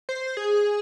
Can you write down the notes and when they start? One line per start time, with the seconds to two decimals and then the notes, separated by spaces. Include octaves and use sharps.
0.09 C5
0.37 G#4